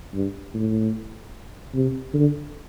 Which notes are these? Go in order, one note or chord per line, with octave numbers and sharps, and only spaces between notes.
G2
A2
C3
D3